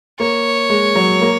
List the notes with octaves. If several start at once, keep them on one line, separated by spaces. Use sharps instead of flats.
A#3 C#5
G#3
F#3
A#3